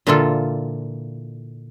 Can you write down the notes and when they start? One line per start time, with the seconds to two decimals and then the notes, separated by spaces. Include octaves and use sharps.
0.07 A#2 D3 E3 A#3 F4 A4